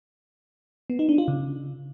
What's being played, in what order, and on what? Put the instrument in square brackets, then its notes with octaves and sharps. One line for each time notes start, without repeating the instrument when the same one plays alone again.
[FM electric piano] B3
D#4
D4
F4
C#3